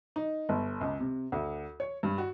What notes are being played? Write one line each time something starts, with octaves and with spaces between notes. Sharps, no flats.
D#4
G1
C#2
C3
D2
C#5
G2
F#4